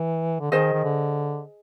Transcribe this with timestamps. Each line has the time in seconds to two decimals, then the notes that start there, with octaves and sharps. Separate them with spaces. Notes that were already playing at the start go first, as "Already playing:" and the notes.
Already playing: E3
0.40 D3
0.51 D#3 G#4 C5 D#5
0.73 D#3
0.84 D3